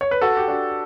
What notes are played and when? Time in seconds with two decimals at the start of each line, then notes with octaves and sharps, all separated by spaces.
0.01 C#5
0.11 B4
0.21 F#4 A4
0.37 G4
0.48 D4 F#4